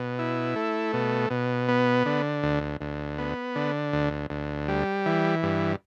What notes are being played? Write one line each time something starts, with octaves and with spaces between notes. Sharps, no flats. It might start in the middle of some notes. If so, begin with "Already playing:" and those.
Already playing: B2
E4
A3
B2
B2
B3
D3
D2
D2
B3
D3
D2
D2
G3
E3
G2